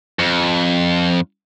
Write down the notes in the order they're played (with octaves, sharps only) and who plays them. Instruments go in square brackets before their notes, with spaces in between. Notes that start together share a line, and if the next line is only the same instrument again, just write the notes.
[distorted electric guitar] F2